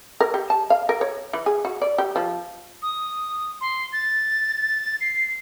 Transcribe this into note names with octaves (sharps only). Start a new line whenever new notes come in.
A#4
G4
A5
F5
A#4
C#5
E3
G#4
F#4
D5
G4
F3
D#6
C6
A6
C7